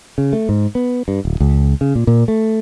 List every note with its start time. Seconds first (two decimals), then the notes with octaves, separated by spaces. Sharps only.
0.18 C#3
0.33 A3
0.49 G#2
0.75 B3
1.08 G2
1.25 D1
1.40 C#2
1.81 C#3
1.95 A#2
2.07 A#2
2.28 A3